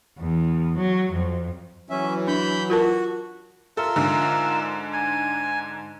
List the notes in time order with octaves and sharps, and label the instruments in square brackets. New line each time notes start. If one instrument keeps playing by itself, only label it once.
[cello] E2
F#3
F2
[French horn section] E3 F#3 [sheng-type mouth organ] C#4 E5
[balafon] D4 [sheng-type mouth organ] B5 G6
[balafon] F4 A#4 A5 [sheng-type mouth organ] F#4
[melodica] F4 A#4 E5 [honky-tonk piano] A4
[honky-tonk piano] G#2 D3
[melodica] G#5